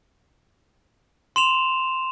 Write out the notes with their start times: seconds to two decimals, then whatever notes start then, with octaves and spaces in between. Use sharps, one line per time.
1.36 C6 E7 F7